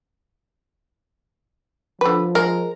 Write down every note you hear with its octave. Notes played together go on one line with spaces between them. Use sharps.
D3 F3 B4
G#3 A#4